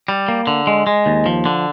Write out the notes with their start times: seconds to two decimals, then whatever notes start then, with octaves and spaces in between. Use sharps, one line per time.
0.08 G3
0.28 A#3
0.47 D3
0.67 G#3
0.87 G#3
1.06 D#2
1.26 F3
1.46 D3